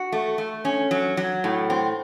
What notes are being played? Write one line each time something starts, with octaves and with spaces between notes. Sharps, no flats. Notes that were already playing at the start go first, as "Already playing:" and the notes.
Already playing: F#4
A3
A3
C#4
F#3
F#3
A2
C4